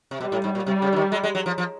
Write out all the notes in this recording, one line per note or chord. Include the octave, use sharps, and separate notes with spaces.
C3
B2 G3
A2
G#2
A#2
C3 G3
C#3
D3
D#3
G#3
G#3
F#3
F3
F3